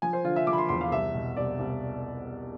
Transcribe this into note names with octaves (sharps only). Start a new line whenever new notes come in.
F3 G#5
C5
D3 F4
E5
F3 D6
B5
C6
E2 C6
F5
C2 E5
B2
C2 D5
C2